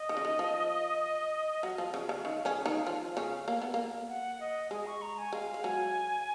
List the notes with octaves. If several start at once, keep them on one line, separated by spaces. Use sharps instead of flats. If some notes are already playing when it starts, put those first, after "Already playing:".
Already playing: D#5
D#3
C#3
D#3
F3
F#3 F5
F3
C#3 F5
C#3
D#3 F5
C#3 C#4
D#3 D#4
F3 F4
C#3 C#4
A#3
B3
A#3
F#5
D#5
G#3 D#5
C#6
A#5
G#5
G#3 F5
G#3
F#3 G#5